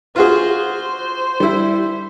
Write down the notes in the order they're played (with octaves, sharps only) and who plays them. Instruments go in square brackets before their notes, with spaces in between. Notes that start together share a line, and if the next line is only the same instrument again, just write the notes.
[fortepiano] F4 F#4 G#4 [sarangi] C5
[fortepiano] G3 E4